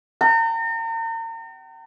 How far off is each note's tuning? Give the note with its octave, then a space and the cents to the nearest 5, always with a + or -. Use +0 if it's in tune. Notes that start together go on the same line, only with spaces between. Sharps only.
G5 -40 A#5 -40